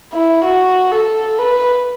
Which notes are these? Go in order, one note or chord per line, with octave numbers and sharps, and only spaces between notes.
E4
F#4
A4
B4